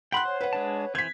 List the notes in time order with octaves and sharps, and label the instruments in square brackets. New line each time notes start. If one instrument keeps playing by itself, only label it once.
[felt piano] F#5 C6 F#6 [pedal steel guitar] G5 B5
[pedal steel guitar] C5 [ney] C#5
[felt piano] B4 F#5
[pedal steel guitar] G#3 D4 A5
[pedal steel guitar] E3 G6 [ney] C4 [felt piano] G#6 B6